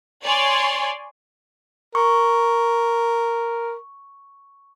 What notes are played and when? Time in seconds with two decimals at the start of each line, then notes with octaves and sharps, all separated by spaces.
0.24 C#5 D5 G#5 C6
1.95 A#4 C#6